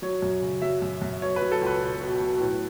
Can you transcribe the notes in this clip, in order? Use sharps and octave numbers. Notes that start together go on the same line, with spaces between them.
F#3 C#5
F#2
C#3
F#3 E5
F#2
F#2
B2 C#5
B4
F#3
A4
C#2
B4
B2
B2
F#3
A2